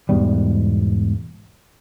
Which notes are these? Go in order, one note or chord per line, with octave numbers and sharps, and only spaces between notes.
E2 G#2 B2 G3